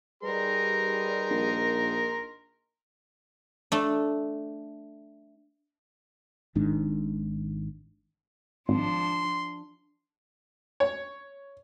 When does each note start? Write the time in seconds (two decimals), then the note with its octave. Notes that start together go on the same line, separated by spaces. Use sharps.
0.23 G3 D#4 G#4 A#4 B4 C6
1.30 A#1
3.72 A3 D4
6.55 G#1 G#2 D#3 D4
8.69 G#1 F3 D4 C6
10.80 C#5